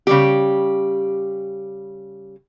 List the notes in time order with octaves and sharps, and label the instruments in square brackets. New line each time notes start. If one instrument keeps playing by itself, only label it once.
[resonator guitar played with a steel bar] C#3 G3 G4